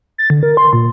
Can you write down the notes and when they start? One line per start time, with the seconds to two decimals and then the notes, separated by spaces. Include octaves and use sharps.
0.18 A6
0.30 D3
0.43 A#4
0.57 C6
0.73 A#2